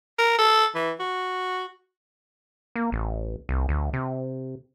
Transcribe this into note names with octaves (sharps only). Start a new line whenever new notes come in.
A#4
A4
E3
F#4
A#3
A1
C2
D2
C3